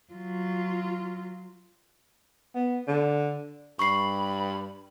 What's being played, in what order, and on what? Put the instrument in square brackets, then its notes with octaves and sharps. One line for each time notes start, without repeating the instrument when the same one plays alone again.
[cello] F#3 F4
[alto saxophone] B3
D3
[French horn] G2 [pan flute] B5 [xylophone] C#6 C7